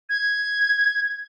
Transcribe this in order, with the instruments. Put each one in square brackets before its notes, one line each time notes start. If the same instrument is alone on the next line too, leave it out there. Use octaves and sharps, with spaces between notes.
[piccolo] G#6